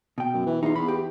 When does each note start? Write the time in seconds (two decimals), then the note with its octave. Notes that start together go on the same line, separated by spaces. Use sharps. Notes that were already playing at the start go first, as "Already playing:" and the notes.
0.18 B2 G5
0.34 F#2
0.46 E3
0.63 E2 D#4 F4
0.76 E2 B5
0.88 G4